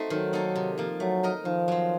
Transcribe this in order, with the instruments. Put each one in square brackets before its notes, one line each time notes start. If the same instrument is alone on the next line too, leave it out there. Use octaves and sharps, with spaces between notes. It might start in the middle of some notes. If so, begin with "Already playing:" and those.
Already playing: [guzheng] A3 C4 D#4 F#4
[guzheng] D#3 [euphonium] F#3
[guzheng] A#3 D#4 A4
C3
F3 A#3
[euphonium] F#3 [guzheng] A3
[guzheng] D#4 A#4 D#5
[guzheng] D#3 [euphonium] F3
[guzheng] F#3 C4